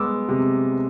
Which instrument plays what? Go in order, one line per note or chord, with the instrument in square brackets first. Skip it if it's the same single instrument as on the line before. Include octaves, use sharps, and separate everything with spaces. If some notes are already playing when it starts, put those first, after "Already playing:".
Already playing: [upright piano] G#3 B3 D6 E6
C3